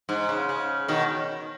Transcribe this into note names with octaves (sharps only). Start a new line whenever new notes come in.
G#2
C#3
C#3
B2 D#3